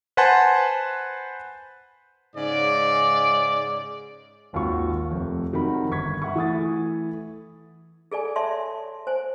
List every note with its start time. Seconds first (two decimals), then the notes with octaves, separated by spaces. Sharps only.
0.17 B4 C5 F#5 G#5 A5 C6
2.36 G#2 C#3 D5
4.53 G#1 D#2 F4 F#4 C#6
5.11 F1 F2
5.53 C3 D#3 F#3 F#4 B5
5.91 G1 C#6 G#6 B6
6.22 E5 F#5 B5 C#6
6.36 E3 A3 D#6 A6
8.12 G#4 A4 D5 G#5
8.36 C#5 D5 E5 A5 C6
9.07 C5 G#5